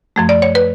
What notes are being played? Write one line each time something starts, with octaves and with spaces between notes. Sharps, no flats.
F#2 F3 A3
D5
C#5
B4